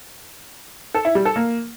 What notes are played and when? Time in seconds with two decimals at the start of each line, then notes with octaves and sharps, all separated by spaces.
0.95 A4
1.05 E4
1.15 G3
1.25 A4
1.36 A#3